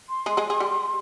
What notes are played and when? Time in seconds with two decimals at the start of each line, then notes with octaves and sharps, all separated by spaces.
0.09 C6
0.26 G#3 G#4
0.37 G#3 G#4
0.50 G#4
0.60 G3 G4